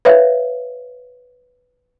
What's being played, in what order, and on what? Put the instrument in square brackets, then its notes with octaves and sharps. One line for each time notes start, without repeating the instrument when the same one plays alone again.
[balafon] B4 C#5 E5 F5